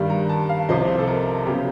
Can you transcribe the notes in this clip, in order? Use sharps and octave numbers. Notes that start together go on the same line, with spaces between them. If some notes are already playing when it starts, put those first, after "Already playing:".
Already playing: G2 D#3 G3
A#5
A5
F5
C2 C3 F3 D#5
A4
A#4
C#3 F#3 B3 G4